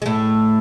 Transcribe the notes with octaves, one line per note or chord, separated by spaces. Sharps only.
G#3
A2 A3